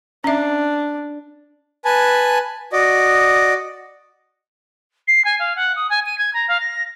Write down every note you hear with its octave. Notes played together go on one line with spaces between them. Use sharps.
C#4 D4 E5
B4 G#5 A5
F#4 D5 D#5
C7
G#5
F5
F#5
D#6
G#5
D#7
G#6
A#5
F5
A#6